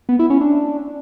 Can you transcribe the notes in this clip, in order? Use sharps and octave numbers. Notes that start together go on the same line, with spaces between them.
B3
E4
C#4
D4